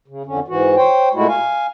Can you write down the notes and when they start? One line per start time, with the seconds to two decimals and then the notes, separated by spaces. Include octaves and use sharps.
0.08 C#3
0.26 F2 D3 C#4
0.48 G#2 E3 F#4
0.76 C5 C#5 G5
1.14 A#2 G#3 A3 E4 F#4
1.28 F5 G#5